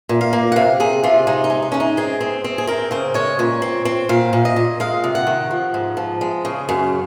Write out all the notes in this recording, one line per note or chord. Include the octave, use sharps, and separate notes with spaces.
A#2
F5
A#3
F#5
C3 F5
C3 G#4
C3 F4
G#3 D#4
D#4
G#3
D#4
G#3 C#4
D#4
C4 G#4
C4
C4
G#4
C4 A#4
C#3 C5
G#3 C#5
A#2 C#5
C4
C4
A#2 F5
A#2
D#5
A#2
G#3 F5
C3
F#5
D#3
F3
G#2
F3
G#3
C#3
F#2